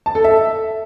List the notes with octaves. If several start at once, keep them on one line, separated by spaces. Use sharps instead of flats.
A5
A4
E5